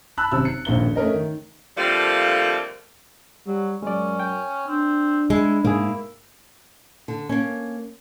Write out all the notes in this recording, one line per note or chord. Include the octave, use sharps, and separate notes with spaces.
A5 B5 E6 F#6
G#1 F#2 C3 E6
C#7
D#1 A#1 A#3 G7
A3 C#4 A#4 D#5
D#3
D3 F3 G3 A3 A#3 C4
F#3 G3
F#2 G#3 C#4 D5
G5
C4 D4
G#3 E4
G#2 A#3 E4 G#4
D3
A#3 C#4